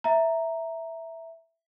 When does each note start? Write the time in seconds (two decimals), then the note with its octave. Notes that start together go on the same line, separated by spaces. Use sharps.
0.04 E5 A#5